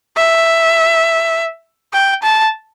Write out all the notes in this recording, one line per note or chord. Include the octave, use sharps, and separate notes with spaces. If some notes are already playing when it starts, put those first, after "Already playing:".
E5
G5
A5